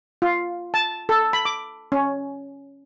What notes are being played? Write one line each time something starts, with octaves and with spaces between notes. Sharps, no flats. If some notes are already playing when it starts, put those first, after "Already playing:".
F4
A5
A4
B5
D6
C#4